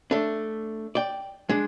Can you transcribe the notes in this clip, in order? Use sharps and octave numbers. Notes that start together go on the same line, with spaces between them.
A3 D4
D5 G5
G#3 D4